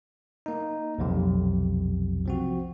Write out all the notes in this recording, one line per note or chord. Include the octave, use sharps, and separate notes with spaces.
A#3 D#4
B1 F2 C3
F3 C4 F#4